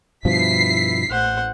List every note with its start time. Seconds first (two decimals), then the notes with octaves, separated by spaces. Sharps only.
0.25 G2 B2 F3 E4 B6 C7
1.11 A1 C5 F#5